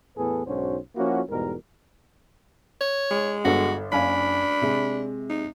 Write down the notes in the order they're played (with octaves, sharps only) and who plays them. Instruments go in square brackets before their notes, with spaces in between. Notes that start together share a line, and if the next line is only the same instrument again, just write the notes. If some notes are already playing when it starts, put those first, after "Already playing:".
[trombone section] E2 A2 B3 G#4 A4 B4
B1 G#2 C#4 D4 F#4 C5
F3 A#3 C#4 E4 F#4
E2 G#2 B2 G3 A#4
[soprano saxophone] C#5
[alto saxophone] G#3
[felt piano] G1 A4 [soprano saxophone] F#4
[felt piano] F#1 F5 G#5 [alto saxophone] D4 [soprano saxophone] B5
[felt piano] C3 G#3
[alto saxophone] D#4